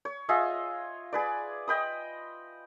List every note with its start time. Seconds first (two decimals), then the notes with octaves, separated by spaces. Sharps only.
0.05 C#5
0.29 F4 G#4 D#5 E5
1.13 G#4 B4 D5
1.68 D#5 G5 B5 D#6